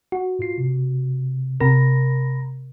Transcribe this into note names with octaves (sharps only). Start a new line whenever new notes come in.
F#4
G#2 F4 C7
C3
C3 A#4 A#5 B5 A#6